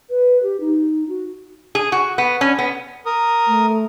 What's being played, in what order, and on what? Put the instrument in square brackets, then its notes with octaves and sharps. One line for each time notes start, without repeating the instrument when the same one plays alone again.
[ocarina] B4
G4
D#4
F#4
[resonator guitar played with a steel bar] G#4
F#4
B3
C#4
B3
[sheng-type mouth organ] A#4 D#6
[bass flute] A3